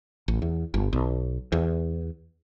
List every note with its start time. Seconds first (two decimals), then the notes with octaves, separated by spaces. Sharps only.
0.28 A1
0.42 E2
0.74 G1
0.93 B1
1.52 E2